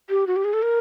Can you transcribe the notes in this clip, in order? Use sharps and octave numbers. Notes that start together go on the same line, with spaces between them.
G4
F#4
G4
G#4
A4
A#4